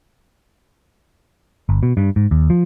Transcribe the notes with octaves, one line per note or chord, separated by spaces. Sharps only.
G1
B2
G2
G#2
D#2
F3